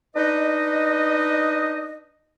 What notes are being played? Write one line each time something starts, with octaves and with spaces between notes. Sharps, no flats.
D4 D#4 B4 D#5